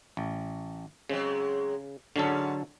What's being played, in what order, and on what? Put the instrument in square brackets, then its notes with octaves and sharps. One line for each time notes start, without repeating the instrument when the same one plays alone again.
[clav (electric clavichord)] A1
[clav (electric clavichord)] C#3 [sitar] F#3 G#3 C4
[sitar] G#2 C#4 [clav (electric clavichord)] D3 F#3 A4